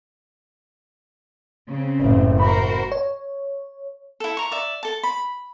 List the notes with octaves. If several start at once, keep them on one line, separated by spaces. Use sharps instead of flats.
C#3 C4
F#1 A2
F#4 A#4 C5 B5
C#5
E4 A4
A#5 C#6
D5 E5
A4 A5
B5